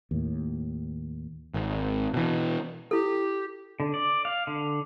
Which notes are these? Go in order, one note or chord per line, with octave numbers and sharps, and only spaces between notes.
D#2 A2
G#1
B2 E3
E4 G4 A4
D3
D5
F5
D3